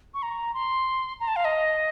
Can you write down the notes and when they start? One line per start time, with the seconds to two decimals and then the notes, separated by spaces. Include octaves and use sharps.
0.14 C#6
0.23 A#5
0.54 C6
1.20 A#5
1.28 A5
1.36 F5
1.45 D#5